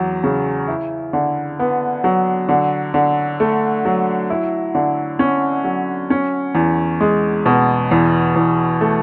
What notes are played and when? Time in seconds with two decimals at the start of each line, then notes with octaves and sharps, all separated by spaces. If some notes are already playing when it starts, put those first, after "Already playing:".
Already playing: E2 F#3
0.24 C#3
0.68 E4
1.13 D3
1.59 B3
2.04 F#3
2.49 D3
2.94 D3
3.40 A3
3.85 F#3
4.30 E4
4.75 D3
5.19 C#4
5.64 F#3
6.10 C#4
6.55 E2
7.01 G#3
7.46 B2
7.91 E2
8.36 E2
8.81 A3